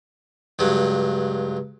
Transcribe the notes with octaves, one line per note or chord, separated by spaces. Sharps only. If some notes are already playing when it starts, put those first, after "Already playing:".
C#2 G2 F#3